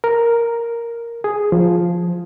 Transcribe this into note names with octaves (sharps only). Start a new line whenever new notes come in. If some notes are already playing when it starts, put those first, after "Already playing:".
A#4
G#4
F3